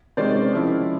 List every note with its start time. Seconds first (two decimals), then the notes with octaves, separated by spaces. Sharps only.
0.17 C3 D#3 G#3 C#4 C5 D5
0.52 C#3 F3 G#3 C#4 E4